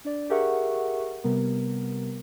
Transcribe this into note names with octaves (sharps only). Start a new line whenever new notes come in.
D4 D5
G4 G#4 A#4 E5 F#5 C#6
C3 G3 B3 A#4